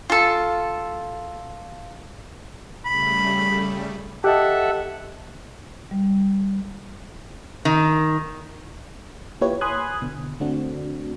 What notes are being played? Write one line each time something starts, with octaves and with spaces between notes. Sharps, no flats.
F4 A4
C#3 G3 A3 B5
G4 A4 D#5 E5 F#5 A5
G3
D#3
A#3 E4 F4 G4 B4 C#5
G#5 B5 C6 D#6 F#6 G#6
B2 D3
D3 A3 C4 D4 F#4